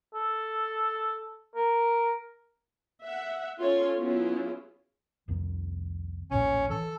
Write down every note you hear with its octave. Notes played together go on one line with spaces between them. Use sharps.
A4
A#4
E5 F#5
C#4 F4 A4 C#5 C6
F#3 B3 C#4 E4 F4 G#4
C2 F2 D#3
A#1 D#2 A2 C#4
E3 A4